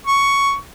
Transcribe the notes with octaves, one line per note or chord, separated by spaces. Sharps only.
C#6